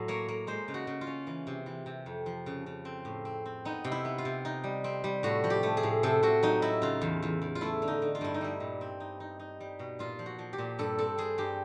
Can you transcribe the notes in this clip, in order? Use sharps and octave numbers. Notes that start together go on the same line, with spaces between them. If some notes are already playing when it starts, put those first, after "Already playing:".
Already playing: A2 F#3
A#3 C#5
A#3
G#3 C5
C#3
F#4
C#3
F4
C#4
E3
C3
E3
C3
F2
F3
C#3
C#3
C4
A2
C4
C4
B3 D#4
C3
E4
B3
F4
C3
D#4
G3
C4
G3
A2 F#4
F3
G4
A3
G#4
A2
C3 A4
C3 F#4
F#3 D#4
F#3 E4
C#3 F4
E2
E2
E2
F4
A3 E4
D3
D#4
D3
F4
G2 E4
D#4
G3 E4
A#2
C4
D#4
D#4
D#4
G3
B2
A#2 F4
F3
F#4
F3
G4
A#2
G2 A4
C4 A4
C4 G#4
G2 G4